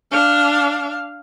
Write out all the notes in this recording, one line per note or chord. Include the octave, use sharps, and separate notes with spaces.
D4 F5